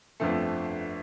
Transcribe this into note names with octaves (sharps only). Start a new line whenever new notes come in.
G1 F2 D3 F3 A3